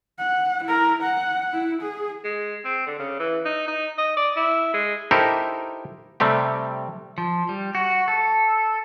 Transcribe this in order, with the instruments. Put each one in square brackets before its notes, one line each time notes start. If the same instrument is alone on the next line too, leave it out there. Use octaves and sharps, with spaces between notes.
[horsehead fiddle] F#5
E4 A#4
F#5
E4
G#4
[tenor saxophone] G#3
C4
D3
C#3
E3
D#4
D#4
D#5
D5
E4
G#3
[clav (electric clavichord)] D#4 E4 G4 A4 A#4 C5
C3 G3 A3 C4 G4
[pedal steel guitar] F3
G3
F#4
A4